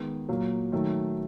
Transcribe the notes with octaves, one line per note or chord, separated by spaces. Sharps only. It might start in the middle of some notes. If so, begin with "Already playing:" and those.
Already playing: D#3 G#3 B3
A#2 F#3 A#3
D#3 F#3 A3